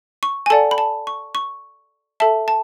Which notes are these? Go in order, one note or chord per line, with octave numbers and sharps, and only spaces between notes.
C#6
G#5
A4 D5 F#5 A5
B5
A5
C#6
C#6
A4 E5 A5
A5